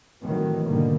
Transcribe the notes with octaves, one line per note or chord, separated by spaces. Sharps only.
A2 C3 D#3 E3 F#3 A3
G#2 B2 D3 D#3 G3 A#3